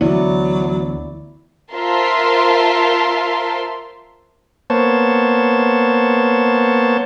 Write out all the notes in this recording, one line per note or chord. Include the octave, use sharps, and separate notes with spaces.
D2 D3 E3 F#3 B3 E4 D5
F4 A#4 C5 E5 A5 C6
A#3 B3 C5 C#5 A5